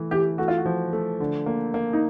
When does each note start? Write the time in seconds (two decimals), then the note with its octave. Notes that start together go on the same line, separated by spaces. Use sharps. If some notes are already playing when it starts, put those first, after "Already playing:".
Already playing: E3 A3
0.11 E3 G4
0.38 A3 F#4
0.48 F4
0.58 F#4
0.65 F3
0.93 A3
1.20 D3
1.46 A#3
1.74 A#3
1.93 D#4